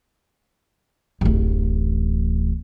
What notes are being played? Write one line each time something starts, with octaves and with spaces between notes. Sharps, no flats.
D1 A1